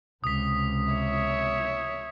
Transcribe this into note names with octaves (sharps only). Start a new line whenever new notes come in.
C#2 C3 D#6 B6
C#5 E5